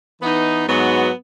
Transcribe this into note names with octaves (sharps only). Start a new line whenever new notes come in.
E3 B3 D#4
G#2 F#3 B3